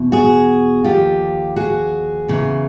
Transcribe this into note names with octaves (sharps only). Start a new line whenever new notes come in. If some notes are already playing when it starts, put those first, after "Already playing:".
Already playing: E2 B2
F#4 G#4
D#2 D3 F3 F4 G4
F#4 G#4
E2 C#3 E3